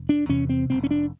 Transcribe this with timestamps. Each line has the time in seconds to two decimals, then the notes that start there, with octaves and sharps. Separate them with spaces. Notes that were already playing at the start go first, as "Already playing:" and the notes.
Already playing: F1
0.09 D4
0.29 E2 C3 C#4
0.49 C4
0.70 F1 C4
0.83 C#4
0.91 D4